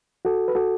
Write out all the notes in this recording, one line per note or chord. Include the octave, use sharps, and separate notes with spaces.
F#4 A4
B4
F#4 A4